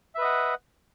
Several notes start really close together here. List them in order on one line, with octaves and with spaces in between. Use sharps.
E5 B4 D#5 F#5